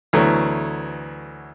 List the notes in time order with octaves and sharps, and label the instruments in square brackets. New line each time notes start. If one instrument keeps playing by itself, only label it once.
[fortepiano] D2 E3 F#3 A3 B3